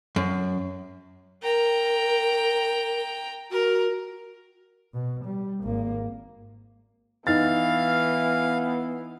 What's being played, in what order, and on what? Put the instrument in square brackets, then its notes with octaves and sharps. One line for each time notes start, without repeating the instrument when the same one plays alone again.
[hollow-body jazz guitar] F#2
[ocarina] A#4 [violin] G5 A#5
[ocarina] F#4 [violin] A#4
[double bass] B2
G3
G#1 A#3
[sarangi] E3 [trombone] B3 [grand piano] D#4 A6 [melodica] F5